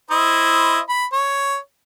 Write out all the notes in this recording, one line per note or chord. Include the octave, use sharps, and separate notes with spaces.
E4 C5 D#5
B5
C#5